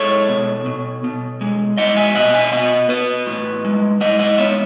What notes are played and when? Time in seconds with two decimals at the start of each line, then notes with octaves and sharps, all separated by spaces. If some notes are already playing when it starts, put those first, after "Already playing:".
Already playing: G#3 A4 C#5
0.29 B2
0.66 B2
1.04 B2
1.41 G#3
1.77 G#3 D#5 F#5
1.96 E5 G#5
2.15 B2 D#5 F#5
2.34 E5 G#5
2.52 B3 D#5 F#5
2.89 B3 B4 D#5
3.27 A2
3.65 G#3
4.01 G#3 D#5 F#5
4.19 D#5 F#5
4.38 B3 C#5 E5